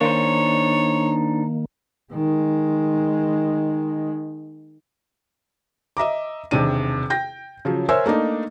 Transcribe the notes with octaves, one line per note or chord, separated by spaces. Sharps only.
D#3 A#3 D4 D#4 C5 C#5
D#3 G#3
D#5 E5 A#5 D6
E1 C3 D#3 D4 D#7
G5 G6 A#6
C#3 F3 F#3
A#4 C5 C#5 E5 G#5 E6
A3 A#3 D4 D#4